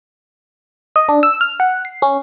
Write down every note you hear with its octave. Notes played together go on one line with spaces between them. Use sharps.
D#5
D4
E6
F6
F#5
C7
C#4